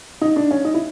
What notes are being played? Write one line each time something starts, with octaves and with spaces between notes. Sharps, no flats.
D#4
D4
C#4
D#4
E4